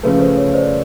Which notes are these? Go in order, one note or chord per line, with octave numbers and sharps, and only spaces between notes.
C#3 F3 A3 B4
C5
C#5
C5 D5